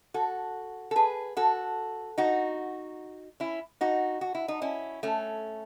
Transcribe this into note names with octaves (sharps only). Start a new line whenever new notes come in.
F#4 A4
A4
G#4 B4
F#4 A4
D#4 F#4
C#4 E4
D#4 F#4
F#4
E4
D#4
C#4 E4
A3 C#4